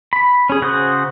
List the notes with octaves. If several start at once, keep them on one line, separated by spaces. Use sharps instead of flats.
B5
C#4 G#4
C#3 F#4 G#4 C5 D#6